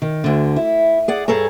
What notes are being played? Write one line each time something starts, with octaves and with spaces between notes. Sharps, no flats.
D#3
D2 D3
E4
G#4 D5 F#5
G2 G#4 A4 C#5 A#5